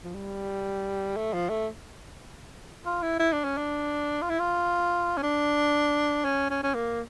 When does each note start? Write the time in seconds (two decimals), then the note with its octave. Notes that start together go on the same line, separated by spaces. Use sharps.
0.04 F3
0.14 G3
1.16 A3
1.33 F3
1.50 A3
2.86 F4
3.02 E4
3.19 E4
3.33 D4
3.44 C#4
3.57 D4
4.22 F4
4.30 E4
4.39 F4
5.17 C#4
5.23 D4
6.25 C#4
6.50 C#4
6.63 C#4
6.75 A#3